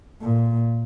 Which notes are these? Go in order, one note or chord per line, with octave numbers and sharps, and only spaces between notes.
A#2